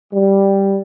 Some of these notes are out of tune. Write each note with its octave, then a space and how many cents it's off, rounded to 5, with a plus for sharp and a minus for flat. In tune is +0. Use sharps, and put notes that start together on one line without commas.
G3 +0